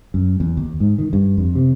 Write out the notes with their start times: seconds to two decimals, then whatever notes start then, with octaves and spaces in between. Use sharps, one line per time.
0.14 F#2
0.40 E2
0.57 D#2
0.80 G#2
0.98 D#3
1.13 G2
1.38 F2
1.55 C3